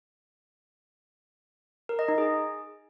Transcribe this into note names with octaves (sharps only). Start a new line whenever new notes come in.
A#4
D#5
D#4
G#4